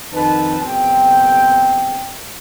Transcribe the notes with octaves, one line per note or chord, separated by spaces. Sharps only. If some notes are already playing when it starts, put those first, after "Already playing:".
F2 D#3 C4 B4 A5
F#1 B2 C4 G5